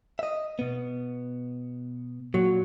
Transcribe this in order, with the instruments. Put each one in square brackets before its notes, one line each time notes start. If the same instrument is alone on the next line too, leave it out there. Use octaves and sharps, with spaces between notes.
[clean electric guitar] D#5 E5
B2 B3
[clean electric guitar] A#2 [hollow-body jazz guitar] F#3